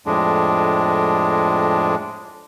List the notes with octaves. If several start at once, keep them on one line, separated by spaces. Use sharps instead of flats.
F2 A2 G#3 D4